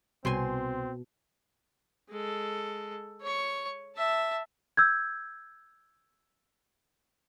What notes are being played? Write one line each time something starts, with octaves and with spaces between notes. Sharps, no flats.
C2 B2 C4 G#5 C6
G#3 A4
C#5 C#6
E5 A5
E6 G6 G#6